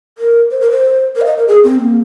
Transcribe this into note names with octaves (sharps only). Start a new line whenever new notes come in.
A#4
C5
A#4
C5
A#4
F5
D#5
A#4
G#4
C4
A#3